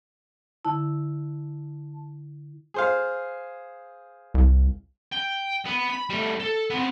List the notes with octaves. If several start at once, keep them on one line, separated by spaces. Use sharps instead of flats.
D3 E4 A5
G#4 C5 F5
C2
G5
B3
B5
G3 A3
A4
B3 C4